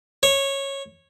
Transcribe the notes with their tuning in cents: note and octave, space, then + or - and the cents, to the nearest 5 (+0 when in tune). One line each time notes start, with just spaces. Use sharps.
C#5 -15